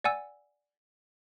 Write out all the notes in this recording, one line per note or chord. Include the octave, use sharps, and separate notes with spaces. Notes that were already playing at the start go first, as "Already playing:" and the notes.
D5 F#5 G#5 E6